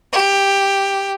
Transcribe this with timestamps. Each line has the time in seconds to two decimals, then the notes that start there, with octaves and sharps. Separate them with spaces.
0.14 G4